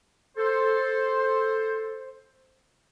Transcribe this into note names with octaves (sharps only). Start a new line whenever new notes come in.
A4 C5